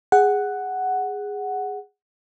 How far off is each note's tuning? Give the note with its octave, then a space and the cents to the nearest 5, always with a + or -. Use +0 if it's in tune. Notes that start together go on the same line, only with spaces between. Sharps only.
G#4 -10 F#5 +5